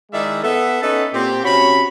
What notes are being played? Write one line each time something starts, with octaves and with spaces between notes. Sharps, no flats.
D#3 G#3 D#4 E4 D5 E5
B3 A4 E5
B3 C#4 D#4 A4 B4 A5
A#2 C4 G4
C3 C#4 F#4 C#5 B5